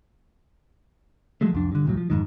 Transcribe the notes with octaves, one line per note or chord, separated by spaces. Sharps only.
F3 F#3 G#3 A3
C2 F2 D4
G2 D3
D#1 C2 A2 F#3
F3
F2 G#2 D#3